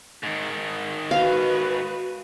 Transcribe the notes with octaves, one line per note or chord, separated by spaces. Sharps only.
G#2 D#3
F#4 B4 F5